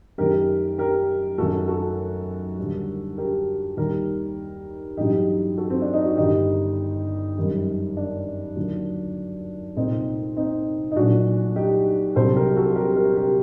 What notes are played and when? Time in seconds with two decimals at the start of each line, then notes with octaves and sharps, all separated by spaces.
0.18 F#2 D#3 A3 G4 A#4
0.78 G4 A#4
1.38 F#2 D#3 F#3 A3 F#4 A4
1.68 F#4 A4
2.57 D#2 D3 G3
3.18 G4 A#4
3.77 D#2 D#3 G3 G4 A#4
4.97 A1 G2 F#3 A3 D#4 G4
5.57 F#4 A4
5.70 C4
5.82 D4
5.94 D#4
6.05 F#4
6.17 G1 G2 D#3 D#4 G4
7.37 F#2 D#3 G3
7.97 D4
8.56 D#2 D3 F#3 A3
9.76 C2 A#2 A3 C4 D#4
10.36 C4 D#4
10.91 D#4
10.96 A#1 A#2 F#3 A3 D4 F#4
11.56 D#4 G4
12.15 C2 C3 F#3 A4 C5
12.35 G4 A#4
12.56 F#4 A4
12.76 G4 A#4
12.95 G4 A#4
13.16 G4 A#4